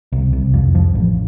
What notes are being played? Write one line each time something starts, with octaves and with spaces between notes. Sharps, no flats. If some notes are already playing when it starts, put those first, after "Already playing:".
C2
C2
F2
F3
A1